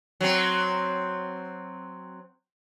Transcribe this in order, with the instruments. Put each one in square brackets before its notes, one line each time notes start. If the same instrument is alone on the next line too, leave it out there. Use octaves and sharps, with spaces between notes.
[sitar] F#3 C4